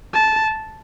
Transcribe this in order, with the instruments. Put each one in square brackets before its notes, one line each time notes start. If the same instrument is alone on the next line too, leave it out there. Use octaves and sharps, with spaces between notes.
[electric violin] A5